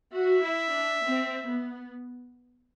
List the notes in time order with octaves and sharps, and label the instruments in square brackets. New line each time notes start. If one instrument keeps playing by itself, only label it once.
[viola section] F#4 [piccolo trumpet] E5
[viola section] E4
D4
C4
B3